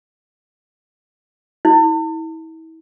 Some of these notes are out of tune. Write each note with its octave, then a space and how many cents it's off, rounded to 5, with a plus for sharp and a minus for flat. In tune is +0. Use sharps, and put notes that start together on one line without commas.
E4 -35